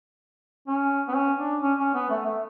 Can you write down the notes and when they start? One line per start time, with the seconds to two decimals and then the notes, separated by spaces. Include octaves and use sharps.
0.68 C#4
1.08 B3
1.16 C#4
1.39 D4
1.63 C#4
1.79 C#4
1.95 B3
2.11 A3
2.26 A3